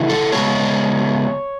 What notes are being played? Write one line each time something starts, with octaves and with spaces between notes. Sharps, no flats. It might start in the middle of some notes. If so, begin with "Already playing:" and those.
Already playing: C#3 E3 A3
A4
C#3 G#3 B3 C#5